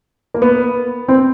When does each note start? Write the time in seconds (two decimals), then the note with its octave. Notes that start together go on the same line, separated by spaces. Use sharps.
0.34 A#3
0.42 B3
1.08 C4